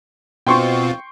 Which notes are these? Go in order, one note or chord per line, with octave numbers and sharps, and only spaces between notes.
B2 C4 F4 G5 C6 C#6